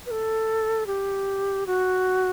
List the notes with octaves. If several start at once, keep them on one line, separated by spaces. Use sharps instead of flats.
B4
A4
G4
F#4